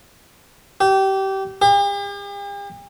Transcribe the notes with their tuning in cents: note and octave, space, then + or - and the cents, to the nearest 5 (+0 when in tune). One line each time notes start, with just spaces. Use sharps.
G4 -25
G4 +45